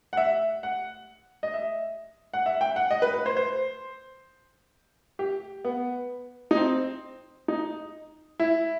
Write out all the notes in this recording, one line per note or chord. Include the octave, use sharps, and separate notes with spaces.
F#5
E5
F#5
D#5
E5
F#5
E5
G5
F#5
D#5
B4
B4
C5
C5
G4
B3
D#4
C4
D#4
E4